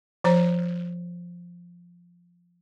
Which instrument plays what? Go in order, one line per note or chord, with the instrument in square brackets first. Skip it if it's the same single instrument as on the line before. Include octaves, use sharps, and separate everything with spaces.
[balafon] F3 C5 A#5